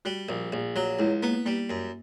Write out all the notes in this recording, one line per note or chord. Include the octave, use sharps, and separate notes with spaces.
G3 F#4
A#1
A#1
F#3 F#4
C#2 E4
A#3 B3
G3 A#3
F#2